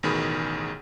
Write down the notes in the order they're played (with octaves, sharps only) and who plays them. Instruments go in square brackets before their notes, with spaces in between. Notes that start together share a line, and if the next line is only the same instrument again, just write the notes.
[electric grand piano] A1 B2 D#3 G#4 B5